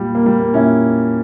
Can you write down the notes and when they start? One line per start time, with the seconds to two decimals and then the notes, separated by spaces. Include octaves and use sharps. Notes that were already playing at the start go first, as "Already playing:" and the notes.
Already playing: A#2 G3
0.15 A#3
0.26 G3
0.39 A#3
0.54 A#2 C#4 E4